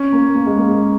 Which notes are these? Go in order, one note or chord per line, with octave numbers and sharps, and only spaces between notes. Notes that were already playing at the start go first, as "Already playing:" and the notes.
Already playing: C#4
A#3
A#3
G#3
A#3